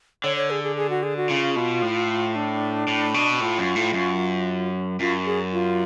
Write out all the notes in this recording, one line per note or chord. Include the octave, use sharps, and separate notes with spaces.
D3 C#5
C#5
G#4
G#4
G#4
F#4
G#4
F#4
C#3 F4
B2
A2
D4
A2
B2
A2 F4
F#2
A2
F#2
F#2 F4
G#4
F4